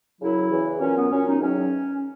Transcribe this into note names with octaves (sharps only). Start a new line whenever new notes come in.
F#2 C#3 F#3 E4
E2 C#3 E3
A#2 F#3 C#4
B3
A#2 F#3 C#4
D#4
E2 D#3 F#3 C#4